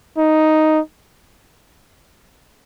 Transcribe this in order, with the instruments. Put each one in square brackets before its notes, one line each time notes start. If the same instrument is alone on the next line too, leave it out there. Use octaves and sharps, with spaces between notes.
[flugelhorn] D#4